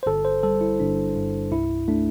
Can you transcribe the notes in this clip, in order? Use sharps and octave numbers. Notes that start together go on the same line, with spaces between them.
C5
G1 A4
C5
G3 A4
E4
G1 D4
G2
C2 E4
A3 D4